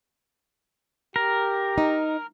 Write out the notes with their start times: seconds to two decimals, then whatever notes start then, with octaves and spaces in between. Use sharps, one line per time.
1.16 G4 A#4
1.78 D#4